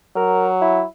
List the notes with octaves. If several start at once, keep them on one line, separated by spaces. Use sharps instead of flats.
F#3 A#4
E4